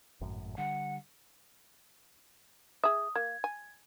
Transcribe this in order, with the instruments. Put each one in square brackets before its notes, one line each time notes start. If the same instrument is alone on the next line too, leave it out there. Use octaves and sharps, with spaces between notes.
[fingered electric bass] G#1 F#2 A2
[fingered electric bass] D3 G3 [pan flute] F#5
[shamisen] G#4 E5 [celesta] D#6
[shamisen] A#3 [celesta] G#6
[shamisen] G#5